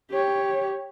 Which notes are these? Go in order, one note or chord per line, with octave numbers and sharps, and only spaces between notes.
G4 C#5